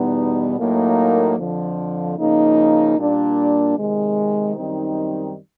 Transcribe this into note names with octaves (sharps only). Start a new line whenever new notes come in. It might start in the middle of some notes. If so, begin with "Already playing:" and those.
Already playing: E2 B2 G3 B3 D#4
A2 F#3 A#3 D#4
F2 D3 F3
C#3 F3 A#3 D#4
A#2 G3 A#3 D4
C3 D#3 G#3
F#2 D#3 G3 C4 D#4